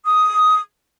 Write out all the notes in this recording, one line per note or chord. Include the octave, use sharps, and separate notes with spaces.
D#6